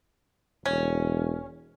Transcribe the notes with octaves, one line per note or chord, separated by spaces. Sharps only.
E1 C#4